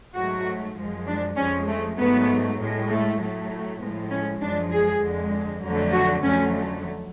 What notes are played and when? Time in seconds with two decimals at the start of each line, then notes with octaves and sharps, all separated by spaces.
0.15 G#2 F#3 A3 F#4
0.76 F#2 F3 G#3
1.07 D4
1.37 F2 F3 G#3 C#4
1.67 A3
1.97 G#2 F#3 A3 B3
2.59 A2 G#3
2.89 A3
3.20 A2 F#3 A3
3.80 A2 F3 G#3 B3
4.10 C#4
4.41 F#2 F3 G#3 D4
4.72 G#4
5.01 F2 D3 G#3
5.63 F2 D3 F#3 A3
5.93 F#4
6.23 F2 D3 F#3 A3 C#4